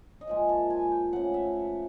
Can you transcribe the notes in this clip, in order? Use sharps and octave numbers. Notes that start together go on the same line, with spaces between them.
D#5
A#2 F3 G#3 E5
A5
G#5
G5
C#3 F3 A3 F#5
E5